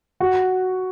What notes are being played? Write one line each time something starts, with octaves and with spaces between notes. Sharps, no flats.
F#4